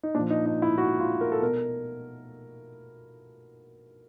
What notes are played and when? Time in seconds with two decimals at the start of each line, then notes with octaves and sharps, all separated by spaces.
0.03 D#4
0.14 A#2 D4
0.19 F3
0.30 D#4
0.46 D#4
0.62 E4
0.78 F#4
1.00 F4
1.21 A#4
1.32 A4
1.42 B2 A#4